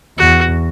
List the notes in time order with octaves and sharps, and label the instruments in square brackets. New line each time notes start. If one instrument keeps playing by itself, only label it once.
[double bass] E2 [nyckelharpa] F#4